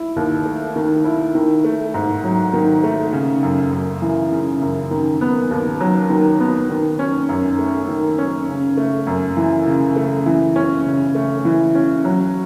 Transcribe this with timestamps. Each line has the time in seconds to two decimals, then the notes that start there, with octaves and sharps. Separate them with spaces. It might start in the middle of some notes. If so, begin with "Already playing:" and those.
Already playing: E4
0.16 D#2
0.45 A3
0.76 D#3
1.04 E4
1.35 D#3
1.64 A3
1.94 G#2
2.24 F#3
2.53 D#3
2.83 A3
3.13 C#3
3.43 F#2
3.72 F#2
4.02 E3
4.32 C#3
4.61 F#2
4.91 D#3
5.21 B3
5.51 D#2
5.80 F#3
6.10 D#3
6.40 B3
6.70 D#3
6.99 C#4
7.29 F#2
7.59 A3
7.89 D#3
8.18 C#4
8.48 C#3
8.77 A3
9.07 F#2
9.37 E3
9.67 C#3
9.96 A3
10.26 E3
10.56 C#4
10.85 C#3
11.15 A3
11.45 E3
11.75 C#4
12.05 F#3